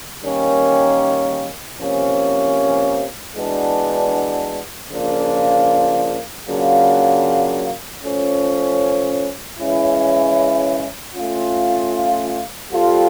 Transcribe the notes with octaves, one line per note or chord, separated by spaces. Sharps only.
D#3 G3 A#3 C#4
C3 F3 A#3 C#4
E3 G#3 B3 D4 F#4
C#3 F3 A#3 D4 F4
C#3 F#3 A#3 D4 F4
F3 A3 C#4
C#3 E3 G#3 C#4 E4
A3 C#4 F4
G3 C4 F4 A4